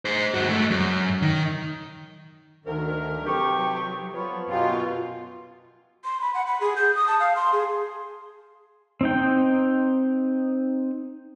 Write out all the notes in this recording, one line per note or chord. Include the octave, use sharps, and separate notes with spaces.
G#4 C5
G2 F#4
G#3 A3
F#2
D#3
D2 D#3 A#4
C3 F#3 D#4 G4 A4 B4 C#6
F3 B3 C#5
F#2 B2 F4 G4
C6
B5
F#5
B5
G#4
G6
D#6
A5
F5
C6
G#4
C4 D#4 G5